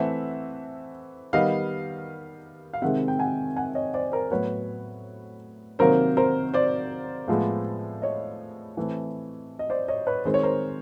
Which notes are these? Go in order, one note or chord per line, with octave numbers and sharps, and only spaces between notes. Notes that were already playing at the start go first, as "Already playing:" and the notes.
Already playing: E3 A3 C4 E5 F#5
D#3 G3 B3 D#5 F5
F5
C3 D#3 G#3 C4 E5 F#5
G5
F#5 G#5
F#5 G#5
C#5 D#5
C5 D5
A#4 C5
A2 F#3 B3 B4 C#5
C3 D#3 F#3 A#3 A#4 C5
A#4 C5
C5 D5
A2 F3 G#3 B3
C#5 D#5
E3 A3 C4
D#5
C5 D5
C#5 D#5
B4 C#5
D#3 G#3 C4 C5
C#5
A#4 C5